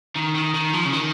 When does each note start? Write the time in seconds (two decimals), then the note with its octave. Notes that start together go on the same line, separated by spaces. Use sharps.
0.16 D#3
0.35 D#3
0.54 D#3
0.73 F3
0.84 C#3
0.92 D#3